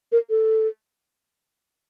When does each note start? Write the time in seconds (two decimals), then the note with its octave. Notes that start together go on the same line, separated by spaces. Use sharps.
0.12 A#4
0.30 A4